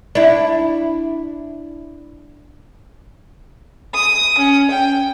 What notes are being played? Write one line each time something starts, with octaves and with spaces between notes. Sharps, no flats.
D4 E4
D#6
C#4
G5